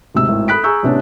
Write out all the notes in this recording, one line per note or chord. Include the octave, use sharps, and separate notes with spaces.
D2 G#2 C3 E6
G#1 A2
A4 B5 D#6 F#6 B6 D7
G#4 G#5 A#5 C#6 E6 G6
A1 C3 B3 C#4 D4 C#5